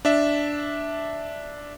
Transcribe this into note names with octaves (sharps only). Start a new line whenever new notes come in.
D4 E5